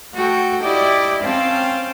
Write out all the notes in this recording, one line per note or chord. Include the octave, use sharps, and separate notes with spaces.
A3 F#4 A4 G5
E4 G4 D5 D#5 G5 D6
C4 C#4 F5 G5 A5